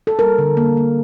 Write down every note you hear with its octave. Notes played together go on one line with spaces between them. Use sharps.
A4
G3 A#4
D3
A#3
A#3